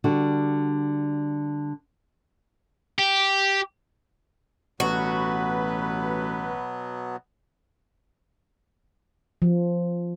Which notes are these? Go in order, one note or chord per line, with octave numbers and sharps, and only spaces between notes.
D3 G3 F#4
G4
A1 B2 F#3 B3 F#4 B4
F3